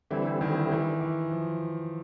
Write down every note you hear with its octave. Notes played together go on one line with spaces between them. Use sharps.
D3 E3 G3 C4 E4
D#3
E3
E3
F3